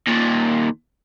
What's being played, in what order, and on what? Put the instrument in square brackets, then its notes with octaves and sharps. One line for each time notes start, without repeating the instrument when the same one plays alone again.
[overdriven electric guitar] D#2 A#2